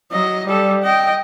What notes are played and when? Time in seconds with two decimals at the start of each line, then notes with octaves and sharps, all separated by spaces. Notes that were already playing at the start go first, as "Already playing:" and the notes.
0.12 F#3 D#5
0.46 G3 A4
0.82 D#5 G5